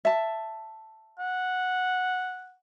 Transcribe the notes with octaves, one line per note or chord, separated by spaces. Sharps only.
E5 A5
F#5